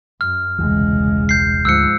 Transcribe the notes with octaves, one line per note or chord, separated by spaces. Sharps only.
F#2 F6
E1 C2 C#3 E3 G#3
G6 C7
D2 G#2 F3 E6 F#6 C#7